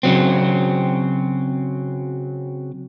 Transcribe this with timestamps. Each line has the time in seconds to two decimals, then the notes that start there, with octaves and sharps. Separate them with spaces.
0.03 C#3 F#3 C4